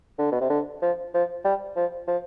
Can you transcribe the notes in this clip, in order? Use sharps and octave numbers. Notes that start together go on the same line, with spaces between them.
D3
B2
C3
D3
F3
F3
G3
F3
F3